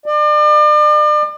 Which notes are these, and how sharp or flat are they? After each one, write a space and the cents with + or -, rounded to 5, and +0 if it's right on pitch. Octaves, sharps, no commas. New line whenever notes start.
D5 +40